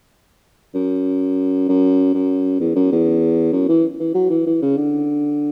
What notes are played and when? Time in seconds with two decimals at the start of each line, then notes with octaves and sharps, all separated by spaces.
0.75 F#2
1.68 F#2
2.14 F#2
2.60 E2
2.76 F#2
2.92 E2
3.53 F#2
3.69 E3
4.00 E3
4.14 F#3
4.30 E3
4.46 E3
4.62 C#3
4.77 D3